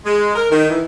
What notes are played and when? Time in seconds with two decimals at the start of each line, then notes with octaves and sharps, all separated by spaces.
0.05 G#3
0.34 A#4
0.51 D#3
0.70 E3